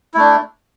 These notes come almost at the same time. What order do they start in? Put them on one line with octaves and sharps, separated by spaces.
E4 A3 D4